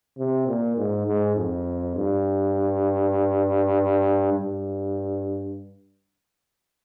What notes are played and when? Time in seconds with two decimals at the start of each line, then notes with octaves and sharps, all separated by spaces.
0.18 C3
0.48 A#2
0.77 G#2
1.06 G#2
1.37 F2
1.96 G2
4.34 G2